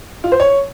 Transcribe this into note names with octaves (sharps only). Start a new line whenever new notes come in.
F4
C5
C#5